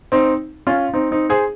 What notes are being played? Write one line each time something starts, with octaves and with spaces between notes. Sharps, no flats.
C4 D#4
C#4 F4
C4 D#4
C4 D#4
G#4 C5